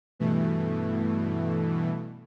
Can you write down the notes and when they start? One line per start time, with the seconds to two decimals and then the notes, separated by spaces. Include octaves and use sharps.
0.20 G2 B2 E3 A3